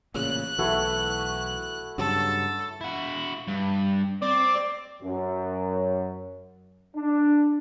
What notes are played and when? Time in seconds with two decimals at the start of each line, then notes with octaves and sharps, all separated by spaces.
0.14 A1 A#2 C#3 F#6
0.59 B1 E3 A3 E4 F#4
1.98 G2 C#3 F#3 A4
2.81 E4 F#4
3.48 G2
4.22 C4 D5 D6
5.03 F#2
6.96 D4